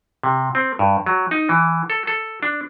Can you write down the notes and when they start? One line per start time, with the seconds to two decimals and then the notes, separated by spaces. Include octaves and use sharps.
0.23 C3
0.55 C4
0.79 G2
1.06 F#3
1.31 D#4
1.49 E3
1.90 A4
2.07 A4
2.43 D4